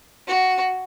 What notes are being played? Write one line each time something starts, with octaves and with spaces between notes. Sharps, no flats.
F#4